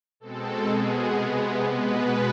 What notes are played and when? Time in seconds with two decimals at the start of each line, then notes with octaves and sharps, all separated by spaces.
0.20 B2 G#3 C4 A4
0.67 B2 G#3 B3 G#4
1.14 C3 G#3 B3
1.61 B2 G#3 B3 B4